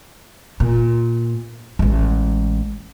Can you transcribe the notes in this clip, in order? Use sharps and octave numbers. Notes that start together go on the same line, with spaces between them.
A#2
A1 G#3